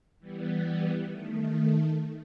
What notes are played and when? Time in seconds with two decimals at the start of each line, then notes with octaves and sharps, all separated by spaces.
0.19 E3 G3 B3
1.08 D#3 A3